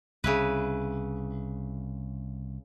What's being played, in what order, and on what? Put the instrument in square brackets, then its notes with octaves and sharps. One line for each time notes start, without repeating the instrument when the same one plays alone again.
[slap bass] C2 [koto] C#3 E4 B4